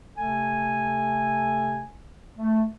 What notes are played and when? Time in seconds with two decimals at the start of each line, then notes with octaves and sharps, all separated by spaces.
0.18 C3 A3 A4 G#5
2.37 A3